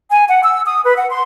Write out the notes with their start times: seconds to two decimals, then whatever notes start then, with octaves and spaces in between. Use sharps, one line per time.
0.11 G#5
0.28 F#5
0.43 E6
0.66 D#6
0.84 B4
0.96 F#5
1.10 C6